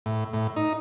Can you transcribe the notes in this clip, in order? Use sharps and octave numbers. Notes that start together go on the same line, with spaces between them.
A2
A2
D#4